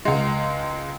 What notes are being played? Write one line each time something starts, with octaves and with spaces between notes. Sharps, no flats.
C#2 G#3